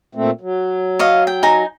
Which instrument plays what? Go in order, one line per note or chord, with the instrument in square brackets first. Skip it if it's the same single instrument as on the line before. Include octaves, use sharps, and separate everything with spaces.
[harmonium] A#2 A3 C4
F#3
[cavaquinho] C#5 D#5 F5
G5
D#4 G#5 A#5